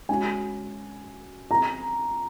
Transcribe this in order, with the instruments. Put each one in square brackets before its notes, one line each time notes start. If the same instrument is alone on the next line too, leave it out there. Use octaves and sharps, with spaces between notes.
[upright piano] G#3 C#4 F#4 [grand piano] G#5
[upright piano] F3 C4 F4 G#4 [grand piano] A#5